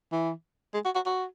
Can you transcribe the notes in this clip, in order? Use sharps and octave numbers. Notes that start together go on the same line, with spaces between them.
E3
G#3
F#4
F#4
F#4